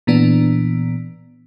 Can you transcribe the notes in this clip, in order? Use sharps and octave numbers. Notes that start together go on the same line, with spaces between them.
A#2 E3 B3 D4